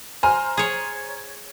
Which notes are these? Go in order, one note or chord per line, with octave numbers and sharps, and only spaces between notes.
C5 G#5 A#5 F6
G#4 C#5